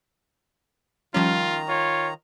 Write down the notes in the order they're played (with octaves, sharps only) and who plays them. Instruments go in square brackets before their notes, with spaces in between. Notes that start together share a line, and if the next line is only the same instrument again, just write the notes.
[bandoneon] D#3 A#5 [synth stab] F3 G3 C#4 [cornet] F4
[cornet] F4 [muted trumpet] C#5